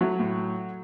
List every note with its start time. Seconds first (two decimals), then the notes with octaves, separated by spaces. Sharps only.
0.01 F#3 A3
0.19 A2